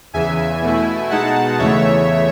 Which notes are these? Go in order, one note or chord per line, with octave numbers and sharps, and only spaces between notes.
E2 C#3 E3 E5 G#5
B2 A3 E4
B2 G#3 D#4 F#5 A5
E2 C#3 E3 A3 C#5 E5